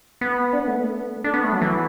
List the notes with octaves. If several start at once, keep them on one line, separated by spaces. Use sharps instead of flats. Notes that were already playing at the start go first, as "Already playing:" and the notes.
B3
D4
B3
A3
B3
A3
D4
B3
A3
F#3
E3